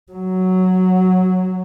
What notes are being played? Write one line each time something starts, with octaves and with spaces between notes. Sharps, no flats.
F#3